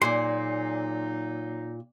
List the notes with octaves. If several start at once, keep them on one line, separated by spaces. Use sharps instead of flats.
A#2 F#3 D#4 G#4 D5 C6